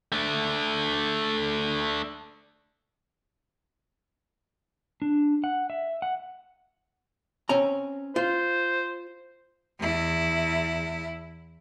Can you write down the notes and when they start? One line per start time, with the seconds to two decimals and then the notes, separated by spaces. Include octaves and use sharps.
0.12 A3 D4
5.02 D4
5.44 F#5
5.70 E5
6.02 F#5
7.49 C4 C#4 A#5
8.16 F4 C5
9.79 E2 E4